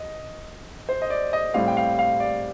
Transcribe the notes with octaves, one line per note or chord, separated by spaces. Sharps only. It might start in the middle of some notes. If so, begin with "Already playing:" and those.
Already playing: D#5
C5
D#5
D5
D#5
A2 G3 C4 F5
G5
F5
F5
D5